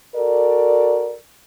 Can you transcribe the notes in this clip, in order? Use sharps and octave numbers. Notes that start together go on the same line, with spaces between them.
F#4 A4 A#4 D5